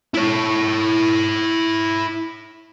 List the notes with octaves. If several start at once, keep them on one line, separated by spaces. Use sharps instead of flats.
E4 C#5